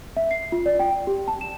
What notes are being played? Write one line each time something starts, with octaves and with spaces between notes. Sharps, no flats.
E5
C7
F4
D5
G5
G4
A5
E7